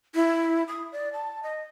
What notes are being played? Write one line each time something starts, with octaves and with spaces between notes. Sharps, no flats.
E4
D#6
D5
A5
D#5